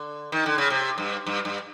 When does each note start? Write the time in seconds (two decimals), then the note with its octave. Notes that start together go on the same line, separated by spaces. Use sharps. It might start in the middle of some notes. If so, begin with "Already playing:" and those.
Already playing: D3
0.32 D#3
0.46 D3
0.58 C#3
0.70 C3
0.98 G2
1.27 G2
1.45 G2